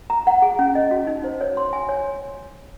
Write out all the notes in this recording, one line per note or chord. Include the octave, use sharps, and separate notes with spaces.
A#5
F#5
G#4
C#4
D#5
F#4
D#4
C5
C#5
C6
G#5
C#5